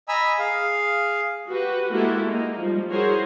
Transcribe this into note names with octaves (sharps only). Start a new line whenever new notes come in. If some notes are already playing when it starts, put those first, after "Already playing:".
D#5 G#5 A#5 B5 E6
G#4 F5
F#4 G4 B4
G#3 A#3 E4 F#4 G4 A4
A#3 D#4
F3 G3
E4 F#4 G#4 A#4 C5 C#5